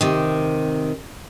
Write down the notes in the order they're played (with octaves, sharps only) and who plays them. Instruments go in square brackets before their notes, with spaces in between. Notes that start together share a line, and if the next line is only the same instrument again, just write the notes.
[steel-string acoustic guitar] C3 D#3